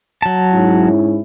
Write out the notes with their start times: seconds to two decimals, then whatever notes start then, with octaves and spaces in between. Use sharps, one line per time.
0.22 F#3 A5
0.53 G#2 C#4 E4